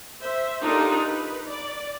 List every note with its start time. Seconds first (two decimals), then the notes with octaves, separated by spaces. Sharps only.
0.23 C5 E5
0.64 D4 D#4 F4 G4 A4 A#4
1.06 D#4 B4
1.46 D5